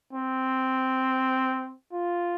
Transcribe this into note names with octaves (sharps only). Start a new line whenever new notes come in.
C4
F4